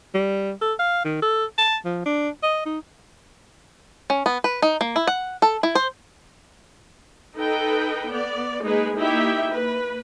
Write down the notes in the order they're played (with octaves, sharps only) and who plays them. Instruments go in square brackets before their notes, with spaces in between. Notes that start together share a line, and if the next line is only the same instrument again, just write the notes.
[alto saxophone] G3
A4
F5
D#3
A4
A5
F3
D4
D#5
D#4
[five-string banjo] C#4
B3
B4
D#4
A#3
E4
F#5
A4
E4
C5
[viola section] D#4 A4 B4 G5
B3 D5
G#3 A#3 D#4 G#4 B4
A#3 D#4 E4 G4 E5 G5
A#3 B4